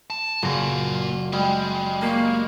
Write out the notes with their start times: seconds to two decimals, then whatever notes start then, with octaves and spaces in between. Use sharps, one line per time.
0.10 A5
0.42 F#1 A#3 F4 A#5 A#6
1.33 G3 G#3
2.02 A#3 A#4 C#6